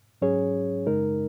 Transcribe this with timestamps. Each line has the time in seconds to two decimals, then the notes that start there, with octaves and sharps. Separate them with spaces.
0.22 G#2 F#3 C#4 G#4 C#5
0.86 F#2 C#3 G#3 D#4 A#4